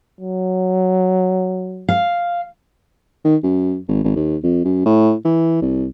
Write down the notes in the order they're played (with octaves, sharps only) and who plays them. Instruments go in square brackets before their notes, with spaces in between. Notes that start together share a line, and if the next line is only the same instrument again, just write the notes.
[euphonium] F#3
[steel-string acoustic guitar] F5
[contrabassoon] D#3
F#2
G#1
G#1
D#2
F2
F#2
A2
E3
C2